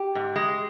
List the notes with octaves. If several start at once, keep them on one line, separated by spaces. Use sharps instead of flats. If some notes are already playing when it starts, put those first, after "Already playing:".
Already playing: G4
G#2
G#3